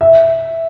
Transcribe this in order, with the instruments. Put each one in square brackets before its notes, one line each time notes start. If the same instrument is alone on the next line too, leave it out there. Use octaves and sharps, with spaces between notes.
[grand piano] E5